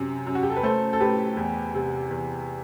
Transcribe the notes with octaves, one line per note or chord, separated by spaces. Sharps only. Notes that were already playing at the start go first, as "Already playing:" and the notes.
Already playing: F#2 C3
F#2
F#4
G4
A4
B4
A3 A4 C5
A4
A2 G4 B4
E2
C3
E2